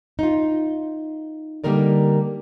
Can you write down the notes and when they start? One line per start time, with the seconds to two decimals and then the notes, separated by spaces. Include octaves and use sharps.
0.19 D#4 F4
1.64 D3 G3 A#3 D#4 A#4 D5